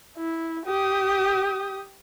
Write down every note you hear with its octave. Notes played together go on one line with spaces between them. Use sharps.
E4
G4 D#6